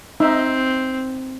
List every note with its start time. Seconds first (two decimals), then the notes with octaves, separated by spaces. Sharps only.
0.20 C4 D#4 E5